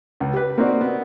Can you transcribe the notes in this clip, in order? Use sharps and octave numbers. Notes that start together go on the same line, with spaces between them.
C#2
G4 B4
A#3 C4 D#4 F#4 D5
B3